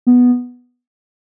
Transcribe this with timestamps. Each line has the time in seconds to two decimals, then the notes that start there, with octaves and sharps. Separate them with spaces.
0.07 B3